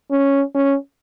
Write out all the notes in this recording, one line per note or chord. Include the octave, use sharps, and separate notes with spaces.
C#4
C#4